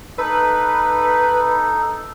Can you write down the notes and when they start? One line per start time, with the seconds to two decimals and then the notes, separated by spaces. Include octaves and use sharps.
0.18 D#4 A4 B4